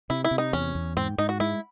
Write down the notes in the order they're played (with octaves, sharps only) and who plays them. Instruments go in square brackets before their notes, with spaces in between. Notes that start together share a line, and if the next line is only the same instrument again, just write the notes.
[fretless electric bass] C3 [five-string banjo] E4
[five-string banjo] E4
[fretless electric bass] C3
[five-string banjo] D#4
[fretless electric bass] E2 [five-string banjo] C#4
[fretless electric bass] E2
[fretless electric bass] G#2 [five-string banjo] C4
[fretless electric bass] G#2 [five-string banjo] D#4
[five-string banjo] F#4
[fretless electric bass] G#3 [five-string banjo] E4